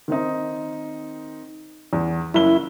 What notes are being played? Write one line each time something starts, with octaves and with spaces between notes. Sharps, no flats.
D#3 C4 D#4
E2
F#1 E4 G7